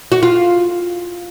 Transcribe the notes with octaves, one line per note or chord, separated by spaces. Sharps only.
F#4
F4